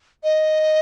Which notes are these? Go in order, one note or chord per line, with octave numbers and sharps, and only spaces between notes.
D#5